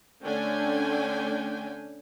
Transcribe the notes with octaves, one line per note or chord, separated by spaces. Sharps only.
D3 A3 C#4 D4 G5 G#5